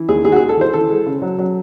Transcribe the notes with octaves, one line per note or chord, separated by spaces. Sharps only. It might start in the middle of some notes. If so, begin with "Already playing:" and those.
Already playing: E3
D#2 G#4
D#2 G#4
F#4
G#3 G#4
A4
E3 C5
E3 A4
G#3
C#3
F#3
F#3